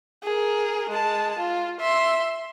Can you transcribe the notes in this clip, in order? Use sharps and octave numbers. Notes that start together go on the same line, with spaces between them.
G#4 A#4
G#3 A5
F4
E5 C6